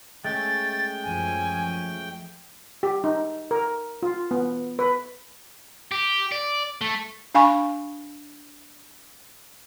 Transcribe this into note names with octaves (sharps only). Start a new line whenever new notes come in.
G#3 A3 C#4 G5 A6
F#2 F3 G#5
G4
D#4
A#4
F4
B3
B4
G4
D5
A3
D4 F5 G#5 B5 C#6